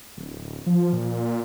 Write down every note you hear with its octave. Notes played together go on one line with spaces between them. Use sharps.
D1
F3
A#2